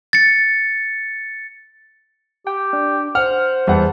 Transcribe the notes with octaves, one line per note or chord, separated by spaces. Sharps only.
A6 C#7
G4 G5
D4
C5 F#5 F6
E2 G3 F#5 A5